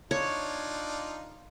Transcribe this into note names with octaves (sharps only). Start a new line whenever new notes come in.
D4 D#4 F4 C#5